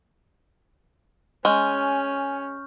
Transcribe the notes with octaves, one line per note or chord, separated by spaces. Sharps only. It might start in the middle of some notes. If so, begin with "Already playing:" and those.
G#3 C#4 G#5 C#6 F6 G6